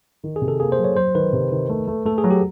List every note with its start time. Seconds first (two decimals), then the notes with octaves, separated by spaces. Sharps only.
0.24 D#3
0.36 G#4
0.42 C3
0.48 A4
0.60 A#3 G#4
0.72 C5
0.79 F#3
0.84 C#5
0.96 F#3 C5
1.15 D#3 B4
1.33 C3
1.51 D#3
1.69 A3
1.87 A3
2.05 A3 A4
2.18 G#4
2.24 F#3
2.31 G4